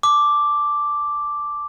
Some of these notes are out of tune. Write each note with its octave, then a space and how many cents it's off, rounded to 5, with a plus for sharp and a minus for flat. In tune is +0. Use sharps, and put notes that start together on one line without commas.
A5 -15 D6 +0